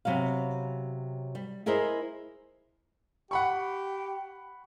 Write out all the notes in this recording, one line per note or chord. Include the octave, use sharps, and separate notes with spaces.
C3 F#3 B3 F5
G3
E4 G#4 A#4 C5 D#5
G4 F#5 B5 C#6